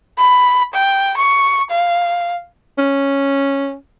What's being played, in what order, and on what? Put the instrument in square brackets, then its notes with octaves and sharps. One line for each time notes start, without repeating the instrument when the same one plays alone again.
[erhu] B5
G5
C#6
F5
[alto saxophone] C#4